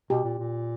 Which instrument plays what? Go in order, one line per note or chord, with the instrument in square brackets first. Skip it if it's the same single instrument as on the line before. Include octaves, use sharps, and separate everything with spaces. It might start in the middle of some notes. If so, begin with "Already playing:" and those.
[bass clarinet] B2 [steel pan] G4
[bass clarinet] A#2
A#2